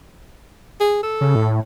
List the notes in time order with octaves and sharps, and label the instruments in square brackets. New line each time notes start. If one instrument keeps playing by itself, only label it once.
[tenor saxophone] G#4
A4
[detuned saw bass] C#3
A2